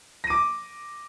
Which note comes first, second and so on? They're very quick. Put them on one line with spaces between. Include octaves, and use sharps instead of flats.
A#6 D#7 D6